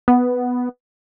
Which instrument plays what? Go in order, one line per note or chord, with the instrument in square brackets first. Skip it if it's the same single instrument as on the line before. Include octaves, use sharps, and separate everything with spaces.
[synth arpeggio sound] B3